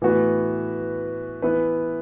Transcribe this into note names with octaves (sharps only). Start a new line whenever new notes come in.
A2 E3 B3 F#4 B4
E3 B3 E4 B4